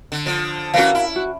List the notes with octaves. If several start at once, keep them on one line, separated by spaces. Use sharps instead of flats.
D3
D3 F3
E3 G3 C#4 F#4 A#4 F5
E4
F#4